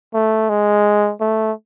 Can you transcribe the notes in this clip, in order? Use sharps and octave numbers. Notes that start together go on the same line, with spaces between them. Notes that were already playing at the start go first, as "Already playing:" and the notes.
A3
G#3
A3